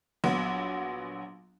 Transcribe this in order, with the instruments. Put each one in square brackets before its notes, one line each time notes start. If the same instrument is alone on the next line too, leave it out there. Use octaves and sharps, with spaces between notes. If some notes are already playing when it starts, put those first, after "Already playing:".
[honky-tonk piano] A#1 F#3 B3